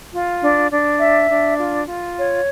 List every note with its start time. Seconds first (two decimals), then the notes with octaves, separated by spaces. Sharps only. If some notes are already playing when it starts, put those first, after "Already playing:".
0.13 F4
0.41 D4
0.71 D4
1.00 E5
1.29 D4
1.59 F4
1.87 F4
2.17 C#5